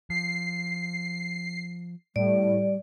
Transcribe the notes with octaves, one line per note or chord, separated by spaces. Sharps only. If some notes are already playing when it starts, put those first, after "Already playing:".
F3 C7
A2 G3 D5